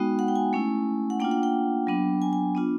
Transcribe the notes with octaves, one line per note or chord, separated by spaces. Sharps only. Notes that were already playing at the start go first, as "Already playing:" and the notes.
Already playing: G#3 B3 D#4 F#4 G5
F#5
G5
G#5
A3 C#4 E4
F#5
A#3 D4 F4 G5
F#5
G5
F#3 B3 D4
G#5
G#5
B3 D4 F4